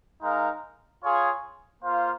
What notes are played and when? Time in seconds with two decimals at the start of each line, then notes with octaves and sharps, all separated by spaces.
0.21 G#3 D#4 A#4 F5
1.03 F4 G#4 C#5 F5
1.82 A#3 F4 C5 F5